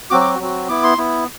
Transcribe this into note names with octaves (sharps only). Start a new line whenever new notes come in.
F#3 C4 F#4 D6
D6
F#3 C4 F#4
B3 E4 D6
C6
B3 E4